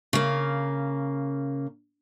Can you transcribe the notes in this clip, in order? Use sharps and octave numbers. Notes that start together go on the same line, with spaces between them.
C#3 A#3